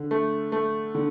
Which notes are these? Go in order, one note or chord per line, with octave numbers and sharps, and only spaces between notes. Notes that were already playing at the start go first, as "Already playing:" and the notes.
Already playing: D3
A3
A3
D3